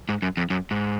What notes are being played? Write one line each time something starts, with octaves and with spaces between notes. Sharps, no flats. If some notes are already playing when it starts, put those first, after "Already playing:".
G#2
F#2
F2
F#2
G#2